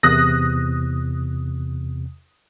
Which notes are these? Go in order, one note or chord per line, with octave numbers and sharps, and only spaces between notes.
E2 C3 D#6 F#6 A#6